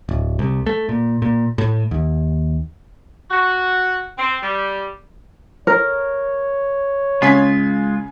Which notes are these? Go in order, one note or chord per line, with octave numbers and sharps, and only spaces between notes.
D1
C2
A3
A#2
A#2
A2
D#2
F#4
C4
G3
A#4 C#5
C#3 G#3 F4 G#5 B6